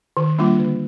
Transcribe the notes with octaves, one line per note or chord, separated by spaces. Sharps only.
D#3
G3 A#3 D4 F4
D3